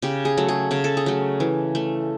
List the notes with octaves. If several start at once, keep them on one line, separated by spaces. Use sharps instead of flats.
C#3 G4
G#4
F#3 A3
G#4
C#3 G#4
A4
G#4
F#3 A3
E3
A3